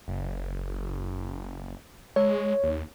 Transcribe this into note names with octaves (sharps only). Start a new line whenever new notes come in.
F#1
G#3 C#5
D#2